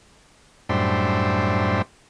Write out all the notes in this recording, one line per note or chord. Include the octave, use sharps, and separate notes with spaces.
F#2 A2 G3 D4 C5 E5